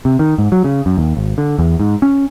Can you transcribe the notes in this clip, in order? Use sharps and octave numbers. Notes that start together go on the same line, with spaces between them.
C3
D#3
G#2
F#3
C#3
F#2
D#2
G#1
D3
E2
G#2
C#4